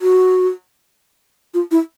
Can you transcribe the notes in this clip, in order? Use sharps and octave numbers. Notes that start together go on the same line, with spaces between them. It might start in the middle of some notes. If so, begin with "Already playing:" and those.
F#4
F4
E4